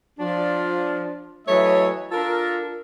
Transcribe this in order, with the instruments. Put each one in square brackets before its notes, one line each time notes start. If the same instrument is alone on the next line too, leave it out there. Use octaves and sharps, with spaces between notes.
[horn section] F3 D4 F4
E3 F#3 A3 C#5 D#5 E5
D4 F4 A4 A#4